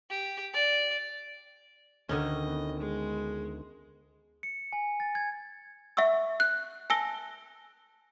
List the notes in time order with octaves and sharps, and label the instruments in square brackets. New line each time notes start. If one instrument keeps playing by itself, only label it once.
[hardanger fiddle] G4
D5
[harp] D2 [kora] D3 D#3 C#4 [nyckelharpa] D#5
[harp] B3 A#6
[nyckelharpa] G#3
[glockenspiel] C#7
G#5
A6
G#6
[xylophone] E5 F#5 C#6 E6
F#6
G#5 A5 E6 A#6 G7